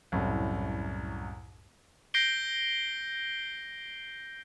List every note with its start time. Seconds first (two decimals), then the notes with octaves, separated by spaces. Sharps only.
0.12 C2 F#2 A2
2.14 G6 A#6 C7 D7 G7